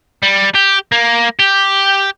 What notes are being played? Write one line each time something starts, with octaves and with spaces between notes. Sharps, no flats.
G3
G4
A#3
G4